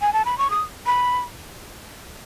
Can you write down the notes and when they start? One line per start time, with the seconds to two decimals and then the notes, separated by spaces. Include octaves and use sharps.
0.01 G#5
0.13 A5
0.25 B5
0.38 C#6
0.50 D#6
0.86 B5